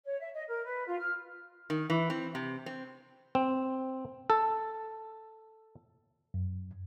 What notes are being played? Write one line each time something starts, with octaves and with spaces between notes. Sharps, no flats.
C#5
E5
D#5
A#4
B4
F4
F6
D#3
E3
C4
C3
C4
C4
A4
F#2